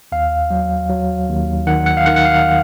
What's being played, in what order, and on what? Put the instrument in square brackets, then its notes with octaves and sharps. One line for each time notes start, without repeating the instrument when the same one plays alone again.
[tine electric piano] D#2 F5
F#3
F#3
D#2
D#3 F#5
F#5
F5
D#3 F#5
F#5
F5